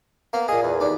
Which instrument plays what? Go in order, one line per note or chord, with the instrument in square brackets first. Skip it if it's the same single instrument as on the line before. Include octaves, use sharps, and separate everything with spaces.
[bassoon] A#3 [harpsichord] B3 C6
[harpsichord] A#2 D#5 [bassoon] G#4
[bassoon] E2
[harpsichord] D#2 D4